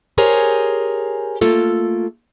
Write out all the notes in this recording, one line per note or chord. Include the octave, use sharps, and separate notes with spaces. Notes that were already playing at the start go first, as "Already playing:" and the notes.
G4 G#4 A#4 C5 C#5 G#5
A3 A#3 F4 A4